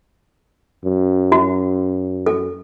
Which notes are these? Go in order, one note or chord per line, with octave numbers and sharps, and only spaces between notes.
F#2
F#4
A4